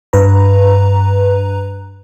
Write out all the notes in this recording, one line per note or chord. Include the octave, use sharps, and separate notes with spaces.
G2 B4 A#5